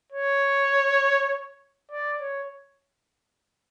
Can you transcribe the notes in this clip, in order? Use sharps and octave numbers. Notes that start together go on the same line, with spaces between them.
C#5
D5
C#5